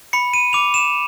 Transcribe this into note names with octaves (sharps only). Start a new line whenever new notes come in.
B5 C#7
D#7
D6 F7
E7